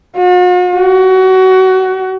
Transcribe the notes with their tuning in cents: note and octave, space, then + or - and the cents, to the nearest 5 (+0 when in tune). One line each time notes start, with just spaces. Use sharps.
F#4 -45
F#4 +25